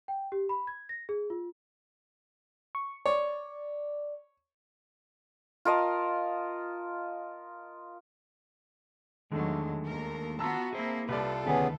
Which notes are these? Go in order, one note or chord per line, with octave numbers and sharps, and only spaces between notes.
G5
G4
B5
G#6
A#6
G#4
F4
C#6
C#5 D5
F4 A#4 D#5 A5
E2 D3 D#3 F#3 G#3 A3 D4 A4
D#2 A#4
B3 F4 F#4 A5 A#5 E6
A#3 C4 E4 G#4 C5
C2 G3 F4 A4 B4 D5
D2 D#3 B3 C#4 G#4 B4